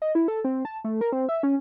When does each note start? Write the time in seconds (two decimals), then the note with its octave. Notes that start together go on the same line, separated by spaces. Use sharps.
0.02 D#5
0.15 E4
0.28 A4
0.44 C4
0.65 A5
0.84 A3
1.01 A#4
1.12 C4
1.29 E5
1.43 C#4